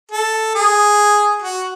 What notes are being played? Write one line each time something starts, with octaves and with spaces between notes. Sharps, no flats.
A4
G#4
F#4